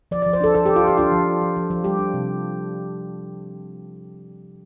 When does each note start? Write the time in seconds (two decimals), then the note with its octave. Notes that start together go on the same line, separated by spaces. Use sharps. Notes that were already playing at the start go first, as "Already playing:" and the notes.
0.11 F3 D5
0.22 D5
0.26 F3
0.33 C5
0.41 D4 A4
0.55 F3 A4
0.66 G4
0.69 F3
0.76 F4
0.84 D4 G4
0.98 D4 F4
1.12 F3
1.27 D4
1.41 F3
1.56 F3
1.71 F3
1.84 G3 G4
1.99 D4
2.14 C3